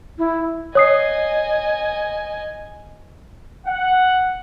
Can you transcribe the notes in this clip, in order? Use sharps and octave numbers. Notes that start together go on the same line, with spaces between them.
E4
C#5 D#5 G#5 D#6 C7
F#5